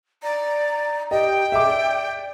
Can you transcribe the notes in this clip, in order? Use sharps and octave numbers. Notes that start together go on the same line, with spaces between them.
D5 A#5
G4 D#5 G5
G#4 E5 D6
D5